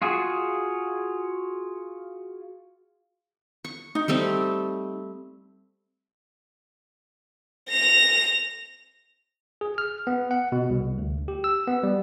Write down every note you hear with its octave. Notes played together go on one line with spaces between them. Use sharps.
F4 F#4 G#4
C#6
D#4
G3 A3 C4
A#6 F7
G#4
F6
B3
F#5
B2
C2
D2
G4
E6
B3
G3